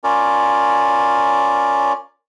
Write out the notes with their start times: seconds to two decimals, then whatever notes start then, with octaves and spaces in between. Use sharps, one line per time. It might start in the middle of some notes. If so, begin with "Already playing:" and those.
0.04 C#4 F4 A#4 C#5 D5